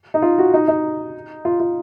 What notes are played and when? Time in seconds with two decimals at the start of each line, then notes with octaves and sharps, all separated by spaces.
0.14 D#4
0.22 F4
0.38 F#4
0.54 D#4
0.68 D#4
1.45 F4
1.60 F4